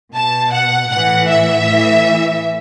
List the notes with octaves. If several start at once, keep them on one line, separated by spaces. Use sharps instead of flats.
B2 A5
F#5
A2 E3 F#5
E5
A2 E3